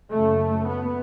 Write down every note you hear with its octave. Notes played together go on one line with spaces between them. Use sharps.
F#1 F#2 C#3 A3
B3